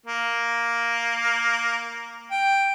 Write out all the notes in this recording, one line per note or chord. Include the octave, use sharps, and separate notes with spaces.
A#3
G5